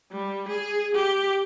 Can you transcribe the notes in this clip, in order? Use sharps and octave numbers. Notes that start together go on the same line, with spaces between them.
G3
G#4
G4